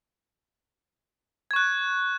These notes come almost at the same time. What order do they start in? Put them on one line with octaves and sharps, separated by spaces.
G#6 C#6 F#6